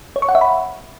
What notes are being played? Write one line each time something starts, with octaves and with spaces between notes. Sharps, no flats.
C#5
C#6
F#5
E5
B5